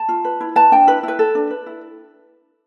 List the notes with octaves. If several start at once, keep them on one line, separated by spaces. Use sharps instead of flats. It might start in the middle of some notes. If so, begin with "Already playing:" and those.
Already playing: A5
F4
B4
E4
B4 A5
D4 G5
E4 B4
E4 B4
A4
D4
B4
E4